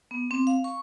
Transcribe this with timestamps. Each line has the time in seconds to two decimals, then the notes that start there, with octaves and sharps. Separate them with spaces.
0.11 B3
0.31 C4
0.47 F5
0.64 C#6